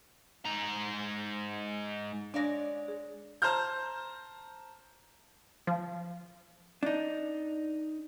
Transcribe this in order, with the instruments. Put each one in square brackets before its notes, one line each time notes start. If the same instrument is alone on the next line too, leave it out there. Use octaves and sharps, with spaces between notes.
[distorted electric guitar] G#2 A#5
[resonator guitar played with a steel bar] G#3 C#5 D5 [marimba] D4 F5 A#6
[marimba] G#4
[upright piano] C5 A5 A#5 F6 G6
[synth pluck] F3
[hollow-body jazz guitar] D4 D#4